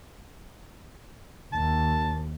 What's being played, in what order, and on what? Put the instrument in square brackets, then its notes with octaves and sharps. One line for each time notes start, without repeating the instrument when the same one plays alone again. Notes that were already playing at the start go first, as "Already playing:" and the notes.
[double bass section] D#2 [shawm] A5